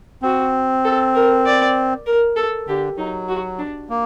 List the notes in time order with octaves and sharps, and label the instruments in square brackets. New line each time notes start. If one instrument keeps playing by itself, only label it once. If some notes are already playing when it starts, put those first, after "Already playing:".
[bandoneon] C4 [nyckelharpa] F#4
[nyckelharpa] A4
A#4
D5
A#4
A4
[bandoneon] D3 [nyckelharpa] G4
[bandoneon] F#3 [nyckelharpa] D#4
[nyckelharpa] F#4
D4
[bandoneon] A#3